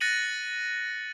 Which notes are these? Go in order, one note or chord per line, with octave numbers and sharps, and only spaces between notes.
F#6 A6 A#6 C#7 D#7 F#7